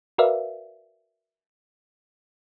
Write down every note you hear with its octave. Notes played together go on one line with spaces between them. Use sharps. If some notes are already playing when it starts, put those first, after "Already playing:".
F#4 A#4 B4 D5 E5 F5